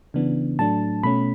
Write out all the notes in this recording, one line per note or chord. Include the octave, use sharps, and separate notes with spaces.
C#3 E3 B3 D4
A2 F#3 A3 D4 A5
B2 A3 C#4 B5